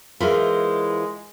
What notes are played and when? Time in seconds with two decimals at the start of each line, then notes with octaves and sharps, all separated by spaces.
0.20 E3 G#3 F4 G#4 A#4 C5 E5